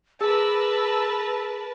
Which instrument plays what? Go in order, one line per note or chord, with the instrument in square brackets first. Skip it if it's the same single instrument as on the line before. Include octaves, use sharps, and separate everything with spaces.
[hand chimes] G#4 [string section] A#4 B4 A5 [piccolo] E6